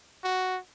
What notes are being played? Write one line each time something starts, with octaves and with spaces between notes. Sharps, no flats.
F#4